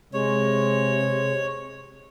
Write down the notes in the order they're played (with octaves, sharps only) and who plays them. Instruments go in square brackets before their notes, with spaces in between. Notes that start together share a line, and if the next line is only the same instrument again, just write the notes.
[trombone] C3 [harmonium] G#3 [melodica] C#5